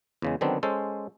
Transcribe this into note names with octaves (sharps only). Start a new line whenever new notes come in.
E2 C#3 G#3
D3 D#3 F#3 B3 C4 D4
G#3 C#4 A4 C5